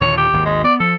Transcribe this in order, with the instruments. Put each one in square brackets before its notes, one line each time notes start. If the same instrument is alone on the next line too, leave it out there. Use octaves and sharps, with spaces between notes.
[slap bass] D#2 A#2 D3 [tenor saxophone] C#5
[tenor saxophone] G4
[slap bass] G#1 D#2
[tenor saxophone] G#3
[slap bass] B3 [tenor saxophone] D5
[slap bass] F3 [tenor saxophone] A4